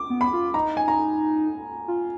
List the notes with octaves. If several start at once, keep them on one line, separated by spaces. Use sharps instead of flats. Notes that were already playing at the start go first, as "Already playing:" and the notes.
Already playing: D6
B3
B5
F4
D#4 A#5
G#5
A#5
F4